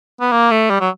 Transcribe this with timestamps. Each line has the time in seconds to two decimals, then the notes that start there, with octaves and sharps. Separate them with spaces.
0.20 B3
0.31 A#3
0.51 A3
0.70 G3
0.81 F#3